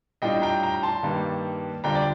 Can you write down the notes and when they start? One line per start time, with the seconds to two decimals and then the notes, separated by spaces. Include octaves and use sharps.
0.22 A2 G3 D4 F4 D#5 G5
0.42 G5 A#5
0.63 G5 A#5
0.83 A5 C6
1.03 G2 D#3 G3 A#3
1.84 D2 D3 G3 D4 F4 G5 A#5
1.95 D5